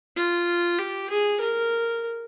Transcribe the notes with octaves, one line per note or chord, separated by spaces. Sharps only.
F4
G4
G#4
A#4